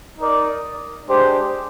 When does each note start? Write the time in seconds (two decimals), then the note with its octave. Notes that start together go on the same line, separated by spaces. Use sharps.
0.20 D#4 A#4 D5
1.08 G#3 D4 G4 C5